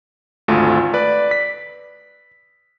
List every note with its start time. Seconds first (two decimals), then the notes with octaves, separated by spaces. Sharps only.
0.48 G#1 D2 A3 F4
0.94 B4 D5
1.31 B6